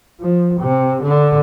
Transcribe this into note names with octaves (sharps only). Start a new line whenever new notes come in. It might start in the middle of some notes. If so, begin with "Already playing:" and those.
F3
C3
D3